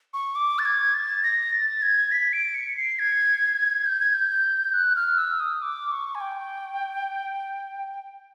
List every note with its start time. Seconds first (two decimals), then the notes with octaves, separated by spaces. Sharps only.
0.14 C#6
0.35 D6
0.59 A6
0.65 G#6
0.94 A6
1.23 A#6
1.53 A6
1.82 G#6
2.11 B6
2.33 D7
2.54 C#7
2.77 C7
2.99 G#6
3.86 G6
4.00 G#6
4.14 G6
4.74 F#6
4.96 F6
5.18 E6
5.40 D#6
5.62 D6
5.92 C#6
6.15 G#5
6.21 G5